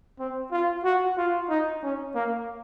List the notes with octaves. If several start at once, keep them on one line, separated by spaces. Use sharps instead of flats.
C4
F4
F#4
F4
D#4
C#4
A#3